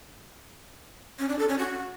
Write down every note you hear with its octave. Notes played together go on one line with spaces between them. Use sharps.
C#4
D4
A4
C#4
F#4